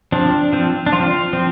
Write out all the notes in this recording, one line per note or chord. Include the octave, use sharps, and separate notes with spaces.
F3 C4 D4
F3 C4
D4
F3 C4 F4
F3 C4